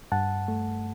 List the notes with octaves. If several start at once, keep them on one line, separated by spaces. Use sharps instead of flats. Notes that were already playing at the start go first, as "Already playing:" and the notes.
G2 F#5 A5
A3